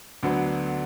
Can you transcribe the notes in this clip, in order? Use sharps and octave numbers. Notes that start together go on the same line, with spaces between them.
D2 D3 F#3 B3